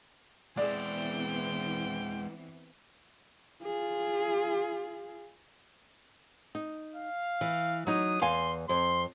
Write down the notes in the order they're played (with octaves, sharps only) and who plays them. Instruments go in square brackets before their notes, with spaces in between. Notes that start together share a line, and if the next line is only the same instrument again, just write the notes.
[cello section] E3 B3 C4 [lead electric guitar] G#3 E4 [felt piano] G#4 D5 [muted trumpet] G5
[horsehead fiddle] F4 G#4
[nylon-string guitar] D#4
[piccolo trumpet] F5
[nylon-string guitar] E3
[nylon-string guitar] F#3 D#4 [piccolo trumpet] D#6
[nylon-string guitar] E2 F5 G#5 [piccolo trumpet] C6
[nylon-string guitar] F2 [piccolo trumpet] C6